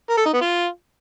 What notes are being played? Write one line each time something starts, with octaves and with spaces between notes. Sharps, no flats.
A#4
A4
D#4
B3
F4